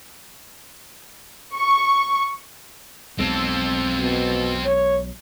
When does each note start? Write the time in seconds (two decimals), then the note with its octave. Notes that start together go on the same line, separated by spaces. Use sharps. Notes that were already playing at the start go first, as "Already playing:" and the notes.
1.55 C#6
3.19 B1 G#3 C4 A4
3.99 B2
4.65 C#5